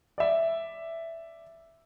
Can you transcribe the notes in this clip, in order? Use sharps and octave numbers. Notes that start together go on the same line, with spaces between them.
D5 E5